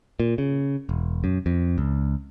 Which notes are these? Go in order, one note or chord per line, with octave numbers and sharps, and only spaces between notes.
A#2
C#3
E1
F#2
F2
C#2